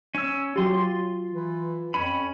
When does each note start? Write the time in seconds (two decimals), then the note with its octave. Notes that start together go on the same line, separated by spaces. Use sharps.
0.15 C#4 E6
0.56 F#3 F4 G4 C6
1.30 E3
1.94 F2 C#4 B5